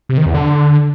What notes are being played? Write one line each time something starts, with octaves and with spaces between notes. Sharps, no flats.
C3
D#3
E2
D3